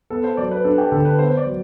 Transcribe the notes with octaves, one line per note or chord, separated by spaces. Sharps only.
B3 A4
C5
F#3 D5
B4
D4 A4
G4
D3 A4
B4
B3 C5
C5
D5
F#3